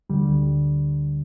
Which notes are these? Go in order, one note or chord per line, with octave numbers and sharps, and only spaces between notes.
D2 D3 G3